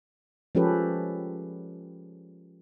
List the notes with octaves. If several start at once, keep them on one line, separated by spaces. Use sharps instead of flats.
F3 G#3 C#4 G4 A4 B4